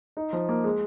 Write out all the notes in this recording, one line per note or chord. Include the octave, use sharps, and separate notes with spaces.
D#4
F3
A#3
G#3